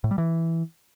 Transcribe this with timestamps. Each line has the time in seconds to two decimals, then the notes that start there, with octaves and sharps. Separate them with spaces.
0.04 A2
0.11 G3
0.18 E3